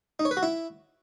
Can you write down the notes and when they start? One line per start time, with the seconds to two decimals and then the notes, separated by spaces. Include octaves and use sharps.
0.19 D#4
0.25 C#5
0.31 B4
0.37 F#4
0.43 E4